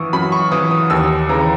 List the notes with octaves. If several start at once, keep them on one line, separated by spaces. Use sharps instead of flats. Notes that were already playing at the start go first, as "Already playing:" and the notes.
Already playing: F#2 E3 C#6 D#6 E6
F#2 B5
C#6
E3 D#6
D#6
D#2 E6
C#3 E3 A#5